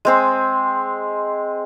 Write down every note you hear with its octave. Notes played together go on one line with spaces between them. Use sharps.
G#3 C4 G#4